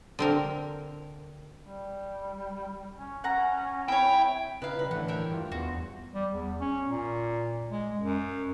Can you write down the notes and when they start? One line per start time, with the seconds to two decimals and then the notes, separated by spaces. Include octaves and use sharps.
0.19 D3 C4 A#4
1.63 G3
2.96 C#4
3.24 C#4 F#5 A#5
3.88 C4 E4 C#5 G5
4.62 C#3 D#4 E4 B4 F5
4.79 G3 E4 B4 A#5
4.91 A2 D3 E3 A3 F#5
5.08 A#4 E5 G5
5.31 G2 F4
5.52 E2 F#4 C5
6.14 G3
6.31 E2
6.61 C#4
6.87 A#2
7.70 G#3
7.96 F#2